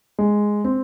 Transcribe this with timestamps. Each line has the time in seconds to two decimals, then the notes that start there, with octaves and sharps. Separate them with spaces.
0.19 G#3
0.65 C4